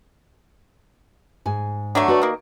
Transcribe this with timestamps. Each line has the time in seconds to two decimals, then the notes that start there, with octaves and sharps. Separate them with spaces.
1.45 G#2 G#5
1.95 D3 F#3 A3
2.08 F#4 B4 D5
2.21 D#3 A#3